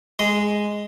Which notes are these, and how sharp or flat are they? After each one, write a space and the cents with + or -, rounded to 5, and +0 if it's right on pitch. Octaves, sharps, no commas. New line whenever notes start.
G#3 +0 C6 -20